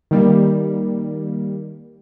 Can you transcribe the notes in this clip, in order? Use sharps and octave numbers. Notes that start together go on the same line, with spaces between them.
D#3 G3 A#3